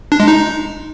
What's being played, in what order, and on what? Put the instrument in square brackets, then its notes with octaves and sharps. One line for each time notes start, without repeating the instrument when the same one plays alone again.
[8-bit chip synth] D4
G#3
D#4